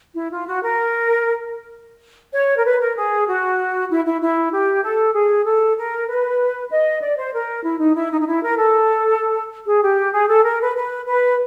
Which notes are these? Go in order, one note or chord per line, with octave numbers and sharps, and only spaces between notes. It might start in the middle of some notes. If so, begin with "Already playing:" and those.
E4
F4
F#4
A#4
C#5
A#4
B4
A#4
G#4
F#4
E4
E4
E4
G4
A4
G#4
A4
A#4
B4
D#5
D5
C5
A#4
E4
D#4
E4
D#4
D#4
E4
A#4
A4
G#4
G4
G#4
A4
A#4
B4
B4
B4